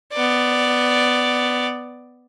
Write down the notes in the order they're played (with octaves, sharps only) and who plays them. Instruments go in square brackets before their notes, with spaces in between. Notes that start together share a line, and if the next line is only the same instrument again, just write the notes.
[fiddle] B3 D5